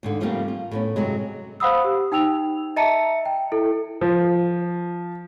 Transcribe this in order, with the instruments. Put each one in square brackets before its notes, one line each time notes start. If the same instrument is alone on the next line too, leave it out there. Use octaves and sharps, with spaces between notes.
[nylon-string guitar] D#2 G#2 D3
C#3 F3 G3 A3 A#3 C4
F4
A2 B3 C#4
G2 C3 F#3 G#3
[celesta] C5 F5 F#5 B5 D#6 E6
G4
D#4 G5 E6 F7
D#5 E5 A5 A#5 C#7
G5
E4 A4
[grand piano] F3